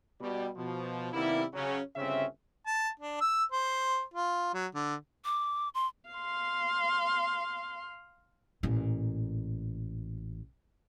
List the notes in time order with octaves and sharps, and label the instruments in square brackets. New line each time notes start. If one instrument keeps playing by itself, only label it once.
[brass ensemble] B2 G3
B2 F3
C3 D#3 G3 A#3 B3 E4
C#3 F#3 C#4
G1 C#3 C4 C#4 E5
[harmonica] A5
D4
E6
C5
F4
F#3
D3
[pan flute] D6
C6
[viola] F5 C6
[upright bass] A1 A#2